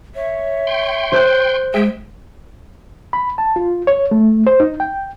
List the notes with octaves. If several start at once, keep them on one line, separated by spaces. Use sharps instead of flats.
C#5 E5
G5 C6
C5 F#6 G6
G#3 G#4 E5 G5
B5
A5
F4
C#5
A3
C5
D#4
G5